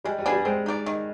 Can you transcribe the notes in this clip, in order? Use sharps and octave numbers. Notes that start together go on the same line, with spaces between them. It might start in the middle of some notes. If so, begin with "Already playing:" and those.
G3 G#3
G3
B3 D4 G#4
G3
G#3 C4
D#4 G4 D5
D#3